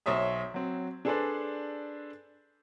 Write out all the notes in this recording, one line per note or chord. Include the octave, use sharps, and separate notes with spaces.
B1 C5 C#5 E5 D#6
F#3 C4
D4 G#4 A4 B4 C5 D5